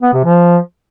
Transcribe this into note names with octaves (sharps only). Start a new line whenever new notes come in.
B3
C3
F3